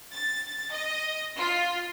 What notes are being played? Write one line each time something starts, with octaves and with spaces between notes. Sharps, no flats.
A6
D#5
F4